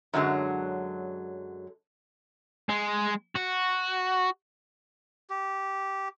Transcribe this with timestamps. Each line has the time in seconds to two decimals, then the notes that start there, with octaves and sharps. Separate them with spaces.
0.13 F#2 D3 F#3 G#3
2.69 G#3
3.35 F#4
5.30 G4